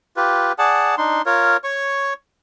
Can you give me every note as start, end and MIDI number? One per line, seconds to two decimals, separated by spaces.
0.17 0.52 65
0.17 0.52 67
0.17 0.52 71
0.59 0.95 68
0.59 0.95 74
0.59 0.95 78
0.59 0.95 81
0.98 1.22 62
0.98 1.22 63
0.98 1.22 84
1.26 1.57 65
1.26 1.57 70
1.26 1.57 73
1.64 2.14 73
1.64 2.14 85